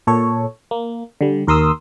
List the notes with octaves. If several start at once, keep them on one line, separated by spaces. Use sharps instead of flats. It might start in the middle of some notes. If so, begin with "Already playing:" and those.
A#2 A4 C#5
A#3
D3 G3
D#2 A#4 C6 D#6 E6